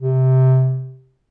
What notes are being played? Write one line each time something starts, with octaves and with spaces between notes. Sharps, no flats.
C3